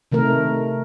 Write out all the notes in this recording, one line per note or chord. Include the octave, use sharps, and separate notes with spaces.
C3 D#3 A3 A#4